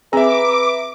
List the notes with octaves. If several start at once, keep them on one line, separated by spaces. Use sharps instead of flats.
C4 G#4 B4 E5 A#5 D6